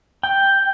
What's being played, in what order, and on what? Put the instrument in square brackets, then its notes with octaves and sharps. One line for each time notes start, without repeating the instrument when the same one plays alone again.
[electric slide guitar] G5